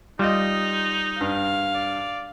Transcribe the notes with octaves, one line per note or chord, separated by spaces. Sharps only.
G3 D#4 F4 D#5
G2 F5
D5